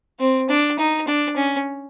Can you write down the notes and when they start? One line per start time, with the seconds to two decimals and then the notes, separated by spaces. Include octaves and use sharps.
0.20 C4
0.49 D4
0.79 D#4
1.07 D4
1.36 C#4